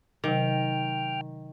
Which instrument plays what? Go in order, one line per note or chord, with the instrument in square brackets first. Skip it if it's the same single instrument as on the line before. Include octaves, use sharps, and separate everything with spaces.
[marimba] C3 F#3 D6 [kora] D#3 [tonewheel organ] G5 F6